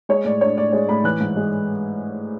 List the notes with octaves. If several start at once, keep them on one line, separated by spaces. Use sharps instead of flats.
G#3 C#5
A2 D5
D4 C#5
A2 D5
G#3 C#5
A2 B5
E3 F#6
G#2
G#3